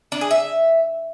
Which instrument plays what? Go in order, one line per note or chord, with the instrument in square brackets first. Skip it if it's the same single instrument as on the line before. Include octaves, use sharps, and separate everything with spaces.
[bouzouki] D4
G#4
E5